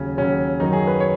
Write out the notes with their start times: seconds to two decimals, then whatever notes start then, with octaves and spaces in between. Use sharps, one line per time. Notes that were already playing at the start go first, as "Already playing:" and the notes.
Already playing: D#2 C#3 F#3 C#4
0.17 D#2 C#3 F#3 C#4
0.60 F#2 D#3 F#3 D#4
0.73 G#4
0.87 B4
1.00 C#5